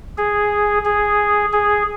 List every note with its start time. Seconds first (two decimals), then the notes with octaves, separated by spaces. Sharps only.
0.18 G#4
0.85 G#4
1.53 G#4